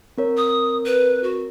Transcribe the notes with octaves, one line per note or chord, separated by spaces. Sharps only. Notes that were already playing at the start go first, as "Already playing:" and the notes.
C4 A#4 C#5
D#6
B4
F#4